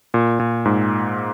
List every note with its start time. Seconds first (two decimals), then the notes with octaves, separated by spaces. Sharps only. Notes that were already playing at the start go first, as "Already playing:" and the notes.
0.14 A#2
0.40 A#2
0.65 G#2